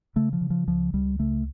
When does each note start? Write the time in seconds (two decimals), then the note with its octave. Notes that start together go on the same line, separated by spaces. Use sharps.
0.16 C#3 A3
0.33 F3
0.41 C#3
0.50 F3
0.67 C#2 F3
0.93 C#2 G3
1.19 C#3 A3